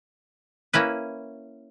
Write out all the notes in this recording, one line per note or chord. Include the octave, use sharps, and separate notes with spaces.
A#3 C#4 E4 B4